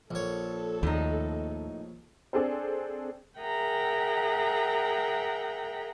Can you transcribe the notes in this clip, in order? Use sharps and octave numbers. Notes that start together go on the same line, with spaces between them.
A#1 A4 C#5
D#2 A2 D#4
C4 D4 G#4 A4 C5
G#4 A#4 E5 F#5 G5 A#5